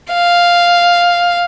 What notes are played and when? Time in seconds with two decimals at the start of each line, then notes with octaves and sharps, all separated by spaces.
0.13 F5